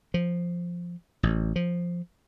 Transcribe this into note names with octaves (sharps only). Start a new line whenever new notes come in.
F3
A1
F3